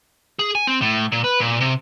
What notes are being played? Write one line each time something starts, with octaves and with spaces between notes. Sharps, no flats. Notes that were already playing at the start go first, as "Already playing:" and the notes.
G#4
G#5
C4
A2
A#2
B4
A#2
C3